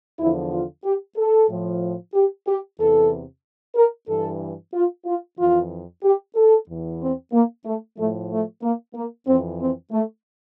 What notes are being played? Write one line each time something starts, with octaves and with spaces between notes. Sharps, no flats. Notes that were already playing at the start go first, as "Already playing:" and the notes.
E2 D3 F3 E4
F4
G4
A4
A2 F3
G4
G4
E2 C3 E3 A4
A#4
G2 E3 A4
F4
F4
F2 E3 F4
G4
A4
E2 E3
C4
A#3
A3
A2 F3 A3
A3
A#3
A#3
F2 E3 C4
C4
A3